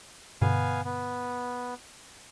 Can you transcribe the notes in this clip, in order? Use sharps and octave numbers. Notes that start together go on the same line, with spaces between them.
G2 B2 D3 B3 F5 G#5
B3